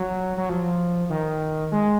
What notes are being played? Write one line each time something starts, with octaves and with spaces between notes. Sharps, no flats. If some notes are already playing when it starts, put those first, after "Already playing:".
Already playing: F#3
F#3
F3
D#3
G#3